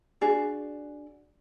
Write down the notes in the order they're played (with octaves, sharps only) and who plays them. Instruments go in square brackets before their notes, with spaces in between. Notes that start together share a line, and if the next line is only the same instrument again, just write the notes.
[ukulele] D4 F#4 G#4 D5